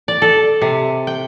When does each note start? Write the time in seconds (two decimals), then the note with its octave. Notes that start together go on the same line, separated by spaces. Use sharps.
0.08 D5
0.22 A4
0.62 C3
1.07 G5